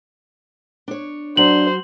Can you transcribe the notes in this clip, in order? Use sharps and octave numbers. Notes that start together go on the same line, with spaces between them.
D4 C#5
F#3 D4 F#4 C5 F#7